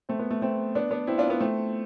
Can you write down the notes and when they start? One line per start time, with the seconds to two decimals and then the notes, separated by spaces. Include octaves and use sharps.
0.09 A3 C4
0.19 B3
0.31 A3
0.42 A3 C4
0.75 B3 D4
0.91 B3 D4
1.07 C4 E4
1.18 D4 F4
1.29 B3 D4
1.40 A3 C4